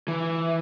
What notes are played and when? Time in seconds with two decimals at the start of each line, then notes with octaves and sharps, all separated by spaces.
0.08 E3